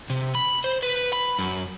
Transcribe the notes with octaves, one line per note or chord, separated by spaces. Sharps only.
C3
B5
C5
B4
B5
F#2